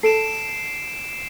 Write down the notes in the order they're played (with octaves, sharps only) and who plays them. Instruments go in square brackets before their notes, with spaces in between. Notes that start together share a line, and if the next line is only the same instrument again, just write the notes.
[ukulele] A4 [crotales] C7 D7 E7